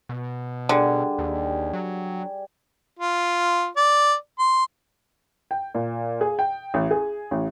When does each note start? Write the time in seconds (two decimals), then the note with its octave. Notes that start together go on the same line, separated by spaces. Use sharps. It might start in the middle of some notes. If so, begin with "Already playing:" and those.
0.09 B2
0.69 D3 G3 G#4
1.18 D#2
1.73 F#3
2.99 F4
3.76 D5
4.39 C6
5.51 G5
5.75 A#2
6.21 G#4
6.39 G5
6.74 A1
6.91 G#4
7.31 A1